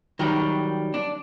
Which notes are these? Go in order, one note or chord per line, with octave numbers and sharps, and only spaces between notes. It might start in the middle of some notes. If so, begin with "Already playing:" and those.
D#3 F#3 G3
D4